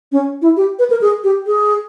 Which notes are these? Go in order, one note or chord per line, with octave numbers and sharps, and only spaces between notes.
C#4
E4
G4
B4
A#4
G#4
G4
G#4